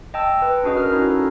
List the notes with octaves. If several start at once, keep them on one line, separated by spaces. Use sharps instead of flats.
D#5 G5 A5 E6
B4
C#4 D4 F#4 G#4 D#5
A#4 F6
C#4 D#4 E4 F#4
A4